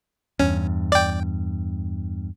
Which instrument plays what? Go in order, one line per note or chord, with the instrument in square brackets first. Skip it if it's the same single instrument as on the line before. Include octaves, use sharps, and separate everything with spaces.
[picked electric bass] E2 G2 [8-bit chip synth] C#4
[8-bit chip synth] D5 G5